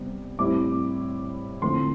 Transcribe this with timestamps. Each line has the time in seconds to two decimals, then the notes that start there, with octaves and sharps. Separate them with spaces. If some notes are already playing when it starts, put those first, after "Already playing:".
Already playing: C3 G3 B3
0.39 A2 G3 C4 E4 D6
1.62 D3 F3 A3 C4 E4 C6